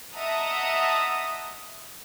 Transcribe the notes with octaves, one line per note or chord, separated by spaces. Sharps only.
D#5 E5 F#5 A5 A#5 D#6